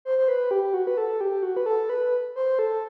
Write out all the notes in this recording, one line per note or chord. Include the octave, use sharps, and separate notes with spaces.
C5
C5
B4
G4
F#4
B4
A4
G4
F#4
B4
A4
B4
C5
A4